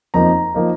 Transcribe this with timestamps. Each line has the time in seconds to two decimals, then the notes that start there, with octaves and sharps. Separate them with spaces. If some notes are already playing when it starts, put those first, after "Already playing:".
0.14 F2 F3 A#3 D#4 A#5
0.54 F3 A#3 D#4